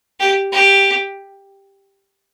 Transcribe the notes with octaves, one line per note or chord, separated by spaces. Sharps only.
G4
G4